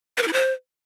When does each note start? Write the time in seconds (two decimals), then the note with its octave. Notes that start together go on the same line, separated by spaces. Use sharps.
0.17 B4
0.23 A#4
0.28 E4
0.33 C5